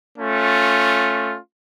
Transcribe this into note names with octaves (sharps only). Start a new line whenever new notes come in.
A3 C#4 F4